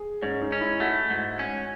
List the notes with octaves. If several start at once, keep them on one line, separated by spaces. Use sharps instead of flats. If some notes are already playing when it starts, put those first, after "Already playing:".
Already playing: G#4
G#2 C#4
D#4
C#4
E4
A3 F#4
G#2
C#4